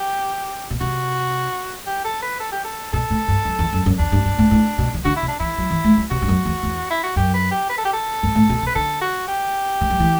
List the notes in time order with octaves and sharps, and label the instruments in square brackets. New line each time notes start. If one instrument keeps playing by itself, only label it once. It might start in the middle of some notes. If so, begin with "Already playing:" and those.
Already playing: [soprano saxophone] G4
[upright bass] B2
[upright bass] C3 [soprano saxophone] F#4
[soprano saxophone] G4
A4
B4
A4
G4
A4
[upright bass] B2 [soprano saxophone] A4
[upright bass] A2
G2
F#2
E2
F#2
F#2
[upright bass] E2 [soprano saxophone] D4
[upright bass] G2
G2
A2
A2
B2
E3
[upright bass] D3 [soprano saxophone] F#4
[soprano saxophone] E4
[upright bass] C3
[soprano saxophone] D4
[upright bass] E3 [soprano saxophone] E4
[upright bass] F#3
E3
A3
G3
[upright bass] C3 [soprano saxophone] F#4
[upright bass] G2
F#2
E2
E2
[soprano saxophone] E4
F#4
[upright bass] F#2 [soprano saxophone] G4
[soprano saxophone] B4
G4
B4
A4
G4
A4
[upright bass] G2
A2
B2
C3
[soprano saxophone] B4
[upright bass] D3 [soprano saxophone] A4
[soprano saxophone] F#4
G4
[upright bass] E3
F#3
E3